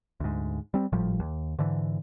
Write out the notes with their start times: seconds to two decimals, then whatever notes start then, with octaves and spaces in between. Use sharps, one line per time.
0.20 D2 G#2
0.74 G3 C4
0.92 G#1 A2 F3 G3
1.20 D#2
1.59 G#2 D3 E3